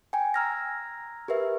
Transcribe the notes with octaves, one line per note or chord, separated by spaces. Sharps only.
G5 G#5
A#5 E6 F6 G#6 A#6
G4 A#4 B4 E5